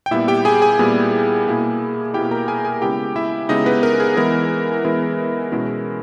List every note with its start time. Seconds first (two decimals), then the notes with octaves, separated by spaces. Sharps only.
0.06 G5
0.11 A#2 G3 B3 E4 E5
0.28 G4 G5
0.45 G#4 G#5
0.62 G#4 G#5
0.79 A#2 G3 B3
1.47 B2 A#3 E4
2.14 B2 A#3 E4 G4 G5
2.31 A#4 A#5
2.48 G#4 G#5
2.65 G#4 G#5
2.82 C#3 G#3 B3 E4 G4 G5
3.16 E4 E5
3.49 C#3 G#3 B3 D#4 E4 D#5
3.66 B3 B4
3.83 A#4
4.00 G#4
4.17 E3 G#3 B3 E4 A#4
4.84 E3 G#3 B3 E4
5.52 B2 G#3 C#4 E4